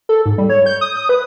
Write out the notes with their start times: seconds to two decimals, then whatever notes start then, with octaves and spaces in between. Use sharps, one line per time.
0.09 A4
0.26 G#2
0.38 G3
0.50 C#5
0.66 G6
0.81 D#6
0.97 D#6
1.09 B4